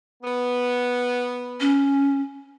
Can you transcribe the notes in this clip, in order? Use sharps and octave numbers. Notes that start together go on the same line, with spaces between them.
B3
C#4